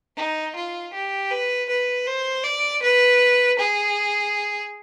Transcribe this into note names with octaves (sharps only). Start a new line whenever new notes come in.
D#4
F4
G4
B4
B4
C5
D5
B4
G#4